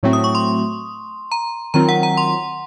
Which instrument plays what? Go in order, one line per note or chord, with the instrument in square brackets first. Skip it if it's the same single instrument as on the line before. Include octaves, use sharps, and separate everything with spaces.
[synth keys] A2 F#3 A3 C4 F#4
[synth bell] D#6
C#6
C6
A#5
[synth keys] D#3 F#3 C4 F4 A#4 [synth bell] A#5
[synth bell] F#5
A#5
C6